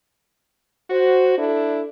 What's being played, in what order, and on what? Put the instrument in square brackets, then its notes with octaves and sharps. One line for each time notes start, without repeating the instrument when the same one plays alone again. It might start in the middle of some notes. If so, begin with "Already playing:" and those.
[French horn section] F#4 C5
D4 E4 A4